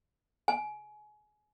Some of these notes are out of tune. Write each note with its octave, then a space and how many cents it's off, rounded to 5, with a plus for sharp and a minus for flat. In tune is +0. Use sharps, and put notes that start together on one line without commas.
G#5 +25